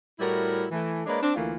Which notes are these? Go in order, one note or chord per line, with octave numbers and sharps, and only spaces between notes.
A2 G3 E4 F#4 A#4
E3 A3
G#3 A#3 D4 B4 C#5 D5
C4 D4
D2 E3 A3 A#3 F4